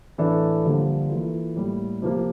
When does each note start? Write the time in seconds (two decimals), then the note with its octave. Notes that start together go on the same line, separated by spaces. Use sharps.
0.18 A2 E3 A3 D4 A4
0.64 G2 D3 F3 A#3
1.10 E3 A#3 F4 A4
1.56 A2 G3 A#3
2.02 C3 F3 A#3